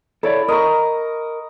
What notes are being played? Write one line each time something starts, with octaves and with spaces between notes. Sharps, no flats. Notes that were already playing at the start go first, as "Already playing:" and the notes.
E4 A4 C#5 D5
A#4 D#5 A#5 C#6